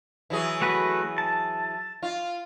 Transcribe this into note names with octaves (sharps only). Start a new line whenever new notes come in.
E3 F#3 G#4
A3 F#4 B4
A5
F4